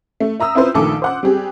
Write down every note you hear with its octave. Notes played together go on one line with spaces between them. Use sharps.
A3
E5 A#5 D#6 E6
C4 E4 F4 B4 C5
A#1 D#3 A3 A4 G#5 D6
C5 F#5 F#6
G3 C4 G4 G#4